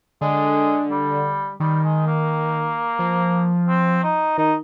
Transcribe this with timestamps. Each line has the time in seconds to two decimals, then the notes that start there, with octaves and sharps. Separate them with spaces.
0.21 D3 G#3
0.91 G3
1.60 D#3 G3
1.83 G#3
2.06 A#3
2.99 F3
3.68 C4
4.03 D#4
4.38 D#3 D#4